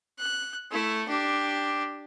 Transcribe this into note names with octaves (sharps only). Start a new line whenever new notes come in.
F#6
A3 E4
D4 G4